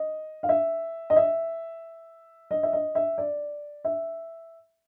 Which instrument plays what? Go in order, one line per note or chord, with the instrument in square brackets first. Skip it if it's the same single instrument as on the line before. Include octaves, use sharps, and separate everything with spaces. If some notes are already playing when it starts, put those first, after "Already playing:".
Already playing: [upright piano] D#5
F5
E5
D#5
E5
D#5
E5
D#5
E5
D5
E5